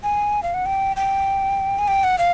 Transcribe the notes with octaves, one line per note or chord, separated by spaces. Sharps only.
G#5
F5
F#5
G5
G5
G#5
G5
F#5
F5